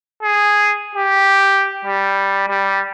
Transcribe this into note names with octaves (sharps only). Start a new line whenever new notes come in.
G#4
G4
G3
G3